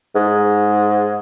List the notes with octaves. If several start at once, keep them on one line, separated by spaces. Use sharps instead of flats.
G#2